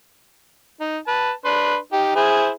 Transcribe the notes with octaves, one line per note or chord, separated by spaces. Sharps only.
D#4
B4 A5
D4 B4 C6
D#4 G4
E4 G#4 C5